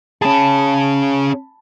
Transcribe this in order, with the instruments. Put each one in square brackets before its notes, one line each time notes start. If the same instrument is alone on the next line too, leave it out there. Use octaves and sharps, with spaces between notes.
[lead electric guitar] C#4 G#4 [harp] A5 B5